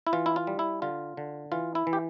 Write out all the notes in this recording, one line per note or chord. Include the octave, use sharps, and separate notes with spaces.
E4
E3 F4
E4
F4
G3
E4
D3 F4
D3
E3 F4
E4
E3
G4